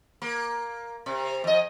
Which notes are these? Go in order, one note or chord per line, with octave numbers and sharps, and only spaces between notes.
A#3
C3
F2 D#5